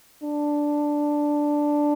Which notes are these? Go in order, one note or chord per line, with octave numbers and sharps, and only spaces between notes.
D4